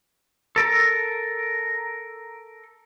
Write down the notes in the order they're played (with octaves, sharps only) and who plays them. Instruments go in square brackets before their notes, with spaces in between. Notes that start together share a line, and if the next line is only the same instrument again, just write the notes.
[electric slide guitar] A4 A#4